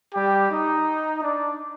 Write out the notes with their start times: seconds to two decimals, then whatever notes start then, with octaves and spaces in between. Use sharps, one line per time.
0.15 G3 G4
0.51 D#4
1.22 D4 D5